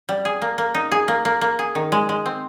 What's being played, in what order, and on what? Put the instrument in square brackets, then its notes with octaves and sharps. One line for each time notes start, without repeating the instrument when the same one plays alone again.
[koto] G3
G#4
A#3
A#3
D#4
G#4
A#3
A#3
A#3
G#4
D#3
G#3
G#3
C4